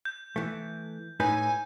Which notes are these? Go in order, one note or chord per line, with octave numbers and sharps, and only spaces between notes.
G6
E3 A3
A2 D#4 B4 G#5 G6